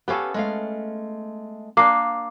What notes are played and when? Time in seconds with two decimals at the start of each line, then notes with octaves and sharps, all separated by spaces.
0.08 B3 C#4 G4 A4 B4 F5
0.34 G#3 A3 F5
1.77 A#3 D4 D6 C7